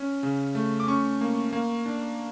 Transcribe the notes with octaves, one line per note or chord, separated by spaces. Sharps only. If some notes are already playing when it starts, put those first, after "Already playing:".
Already playing: C#4
C#3
A3
D6
C#4 C#6
A#3
A#3
D4